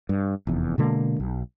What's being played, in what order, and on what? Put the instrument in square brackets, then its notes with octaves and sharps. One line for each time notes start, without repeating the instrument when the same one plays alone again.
[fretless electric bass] G2
F1 E2
B2 D3 G#3 A#3
B1